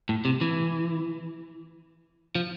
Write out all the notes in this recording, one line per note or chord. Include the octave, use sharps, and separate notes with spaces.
A2
C3
E3
F3